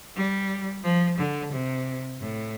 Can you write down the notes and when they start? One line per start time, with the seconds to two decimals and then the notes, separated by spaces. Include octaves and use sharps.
0.15 G3
0.83 F3
1.18 D3
1.52 C3
2.21 A2